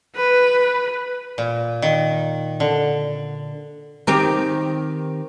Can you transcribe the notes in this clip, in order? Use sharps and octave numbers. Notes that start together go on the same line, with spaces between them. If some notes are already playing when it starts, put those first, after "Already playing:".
B4
A#2
D#3
D3
D#3 C4 G4